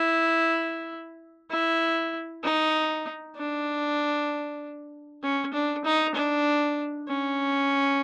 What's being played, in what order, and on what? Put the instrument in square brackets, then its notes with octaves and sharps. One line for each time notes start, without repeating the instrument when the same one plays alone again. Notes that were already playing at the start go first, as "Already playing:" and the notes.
Already playing: [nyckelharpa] E4
E4
D#4
D4
C#4
D4
D#4
D4
C#4